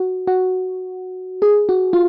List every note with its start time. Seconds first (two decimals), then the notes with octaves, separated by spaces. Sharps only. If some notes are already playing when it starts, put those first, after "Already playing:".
Already playing: F#4
0.27 F#4
1.42 G#4
1.69 F#4
1.93 F4